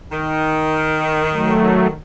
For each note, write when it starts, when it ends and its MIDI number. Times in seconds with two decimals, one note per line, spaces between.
0.12 1.94 51
1.32 1.87 54
1.32 1.87 57